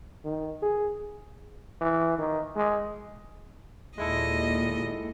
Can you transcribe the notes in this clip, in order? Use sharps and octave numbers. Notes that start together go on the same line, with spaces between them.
D#3
G#4
E3
D#3
G#3
D#2 A#2 G#3 E4 A4 D#5